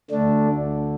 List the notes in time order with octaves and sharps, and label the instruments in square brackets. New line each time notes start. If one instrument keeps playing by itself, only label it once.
[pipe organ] D2 D3 A3 D4